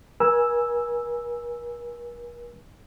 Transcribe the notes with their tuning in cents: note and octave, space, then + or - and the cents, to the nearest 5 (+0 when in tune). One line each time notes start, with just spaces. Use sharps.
A#4 +45 G#5 +0 E6 +0